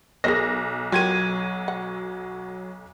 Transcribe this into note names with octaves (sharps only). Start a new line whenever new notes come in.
B1 G#4 A#4 D#5 A#6
F#3 F4 G4 A#4 G#6 D#7
F#5